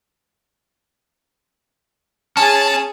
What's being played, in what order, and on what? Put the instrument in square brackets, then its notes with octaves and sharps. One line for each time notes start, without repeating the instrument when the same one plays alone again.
[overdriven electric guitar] C#4 [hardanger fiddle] G#4 [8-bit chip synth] A5